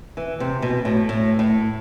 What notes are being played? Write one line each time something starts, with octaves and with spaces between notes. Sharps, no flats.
E3
C3
B2
A2
A2
A2